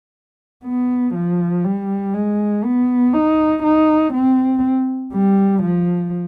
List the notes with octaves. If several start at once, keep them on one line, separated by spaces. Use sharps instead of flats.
B3
F3
G3
G#3
B3
D#4
D#4
C4
G3
F3